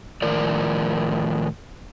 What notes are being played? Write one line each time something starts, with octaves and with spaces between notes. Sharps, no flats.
A2 D#3 F3 A#4 D5